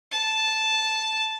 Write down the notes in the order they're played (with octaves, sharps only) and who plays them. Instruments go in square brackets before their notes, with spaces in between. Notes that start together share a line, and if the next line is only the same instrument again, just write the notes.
[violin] A5